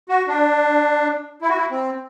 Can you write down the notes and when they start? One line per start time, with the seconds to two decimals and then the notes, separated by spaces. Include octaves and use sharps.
0.09 F#4
0.28 D4
1.42 E4
1.49 F#4
1.56 E4
1.71 C4